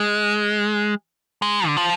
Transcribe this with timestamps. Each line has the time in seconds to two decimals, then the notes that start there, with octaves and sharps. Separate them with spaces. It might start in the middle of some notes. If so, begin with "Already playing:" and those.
Already playing: G#3
1.42 G#3
1.67 D3
1.77 F3